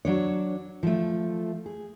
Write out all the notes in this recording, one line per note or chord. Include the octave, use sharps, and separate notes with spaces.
F#3 D4 C#5
F3 A3
G#4